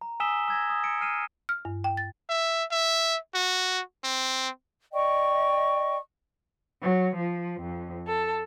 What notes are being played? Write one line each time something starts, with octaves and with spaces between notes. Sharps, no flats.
A#5
G#5 D#6 E6 B6 E7 G7
E6 G#6 A#6
D#6
E6 A#6 C#7 D7
F6 C7 D#7 E7
F6
G2
G5
A6
E5
E5
F#4
C4
D5 D#5 G5 C#6
F#3
F3
F2
A4